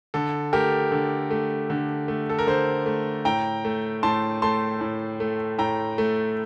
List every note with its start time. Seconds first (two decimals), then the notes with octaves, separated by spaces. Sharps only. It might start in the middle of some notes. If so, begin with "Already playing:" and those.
0.14 D3 A4
0.53 A3 G4 A#4
0.92 D3
1.30 A3
1.70 D3
2.08 A3
2.29 A4
2.39 A#4
2.47 D3 A4 C5
2.86 A3
3.25 A2 G5 A#5
3.65 A3
4.03 A2 A5 C6
4.42 A3 A5 C6
4.81 A2
5.20 A3
5.59 A2 G5 A#5
5.98 A3